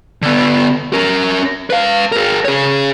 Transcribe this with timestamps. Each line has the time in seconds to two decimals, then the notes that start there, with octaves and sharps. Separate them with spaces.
0.22 D3 B3
0.93 C#4 A#4
1.70 B4 F5
2.12 G#4 A#4
2.45 G#4 C#5